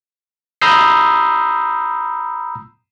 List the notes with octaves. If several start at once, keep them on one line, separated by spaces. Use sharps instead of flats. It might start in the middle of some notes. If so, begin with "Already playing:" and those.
A#5 B5 D#6 E6 G6 C7